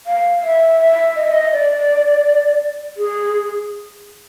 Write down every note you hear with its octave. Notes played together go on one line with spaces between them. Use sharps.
F5
E5
E5
D#5
E5
D#5
D5
G#4